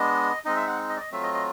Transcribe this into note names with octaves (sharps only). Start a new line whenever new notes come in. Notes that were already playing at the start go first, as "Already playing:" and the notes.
Already playing: G#3 B3 D4 D#5
G#3 C4 D#4 D#5
E5
F#5
D#5
D5
D#5
F#3 A3 C4 F4 E5
D#5
D#5